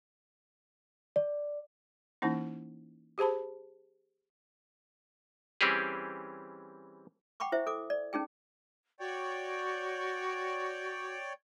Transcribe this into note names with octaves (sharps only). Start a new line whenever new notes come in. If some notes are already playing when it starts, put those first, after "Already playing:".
D5
E3 A#3 C#4 D#4 E4
G4 G#4 C5 A5 B5
E3 G3 C4 C#4 G4 G#4
F#5 G5 B5 C#6 D6
E4 C5 E5
A4 D6
D5
C#4 D#4 G#4 G5
F#4 C#5 D5 G5